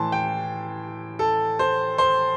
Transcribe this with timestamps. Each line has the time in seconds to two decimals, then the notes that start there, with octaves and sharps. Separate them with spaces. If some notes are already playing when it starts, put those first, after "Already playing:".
Already playing: A2 E3 A5 C6
0.12 G5
1.19 A4
1.59 C5
1.98 C5